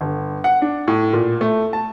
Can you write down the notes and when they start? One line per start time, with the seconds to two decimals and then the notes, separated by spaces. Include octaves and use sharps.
0.01 G1
0.44 F#5
0.62 D4
0.88 A2
1.13 A#2
1.41 A3
1.73 A5